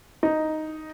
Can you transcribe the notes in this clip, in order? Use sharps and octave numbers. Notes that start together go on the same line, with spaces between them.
D#4